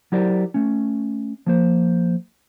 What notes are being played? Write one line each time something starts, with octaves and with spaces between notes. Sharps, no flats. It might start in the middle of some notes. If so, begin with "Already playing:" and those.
F#3 E4 G4 A#4 C5 D5
A3 C#4
F3 A#3 C5